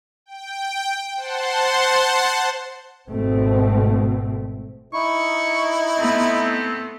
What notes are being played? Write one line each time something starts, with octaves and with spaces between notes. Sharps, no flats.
G5
C5 F#5 A5 C6
G#1 B2 A3 C4
D#4 E4 C#6
A3 B3 C4